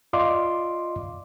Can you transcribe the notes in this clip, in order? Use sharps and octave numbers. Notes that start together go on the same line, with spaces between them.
F4 D5 D#5 F5 C6 D6